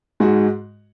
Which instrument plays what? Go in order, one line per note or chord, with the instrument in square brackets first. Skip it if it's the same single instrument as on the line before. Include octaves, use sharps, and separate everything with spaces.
[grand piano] G#2 G#3 F#4